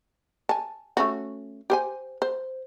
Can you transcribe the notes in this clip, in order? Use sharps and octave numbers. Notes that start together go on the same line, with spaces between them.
G#5 A5
A3 C#4 F#4
G4 C5 G#5
C5